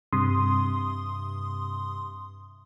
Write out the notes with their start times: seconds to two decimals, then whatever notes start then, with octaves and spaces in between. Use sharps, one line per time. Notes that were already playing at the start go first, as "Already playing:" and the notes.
0.13 G2 C3 C6 D#6